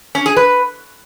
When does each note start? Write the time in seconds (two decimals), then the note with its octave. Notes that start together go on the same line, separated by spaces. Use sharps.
0.15 C#4
0.26 G#4
0.37 B4